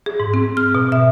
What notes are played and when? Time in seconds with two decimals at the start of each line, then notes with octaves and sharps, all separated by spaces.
0.06 G#4
0.20 G#2
0.34 C4
0.57 F6
0.75 B2
0.92 E5